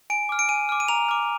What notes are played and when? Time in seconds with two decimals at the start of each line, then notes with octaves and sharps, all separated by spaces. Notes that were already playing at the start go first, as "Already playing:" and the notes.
0.10 G#5 D7
0.29 D6 F6
0.39 D7
0.49 G#5 D#7
0.69 D6 F6
0.80 D#7
0.88 A#5 F7
1.09 D6 F6